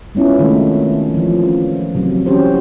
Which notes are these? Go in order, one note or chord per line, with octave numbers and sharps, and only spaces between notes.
G#3 B3 C#4 E4 F4
C3 D#3 G#3 A3
E3 F3
C#4
C3 F#3
E3 C#4 F#4 G4 C5